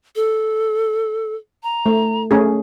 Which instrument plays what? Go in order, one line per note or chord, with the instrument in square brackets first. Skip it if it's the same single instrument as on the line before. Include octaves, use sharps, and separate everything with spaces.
[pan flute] A4
A#5
[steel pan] A3
A3 C#4 G#4